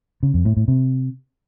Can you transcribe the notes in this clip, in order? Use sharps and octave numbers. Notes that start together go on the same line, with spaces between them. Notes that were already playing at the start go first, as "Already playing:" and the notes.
C#3
F2
A2
A2
C3